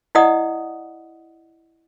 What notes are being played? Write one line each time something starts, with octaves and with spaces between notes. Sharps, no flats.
E4 D5 D#5 F#5 D#6